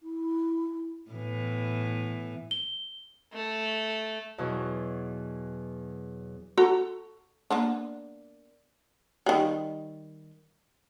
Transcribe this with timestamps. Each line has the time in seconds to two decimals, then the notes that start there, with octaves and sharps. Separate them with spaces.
0.02 E4
1.11 A2 E3 B3
2.51 G7
3.33 A3
4.38 E2 B2 E3 F#3
6.58 F#4 A4 A#5
7.50 A#3 B3 D4
9.26 D#3 G3